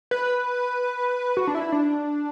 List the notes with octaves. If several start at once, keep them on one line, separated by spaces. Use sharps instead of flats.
B4
F#4
D4
E4
D4